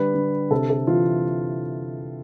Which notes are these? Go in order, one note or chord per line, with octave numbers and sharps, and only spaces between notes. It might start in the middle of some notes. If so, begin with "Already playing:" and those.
Already playing: D3 G3 B4
D3
C3 A4
A4
E3 F4